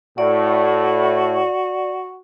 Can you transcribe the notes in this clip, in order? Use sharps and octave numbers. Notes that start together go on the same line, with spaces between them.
A2 F#4 D5